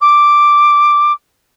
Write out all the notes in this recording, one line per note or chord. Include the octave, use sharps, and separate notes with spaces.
D6